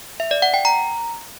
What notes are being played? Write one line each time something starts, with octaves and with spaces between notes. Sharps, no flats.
E5
D5
F#5
G5
A#5